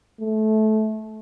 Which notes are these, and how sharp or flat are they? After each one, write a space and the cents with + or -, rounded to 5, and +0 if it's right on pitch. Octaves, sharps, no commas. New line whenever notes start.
A3 -20